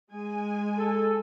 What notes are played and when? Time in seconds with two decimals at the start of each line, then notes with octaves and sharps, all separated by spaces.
0.12 G#3 G#5
0.78 A4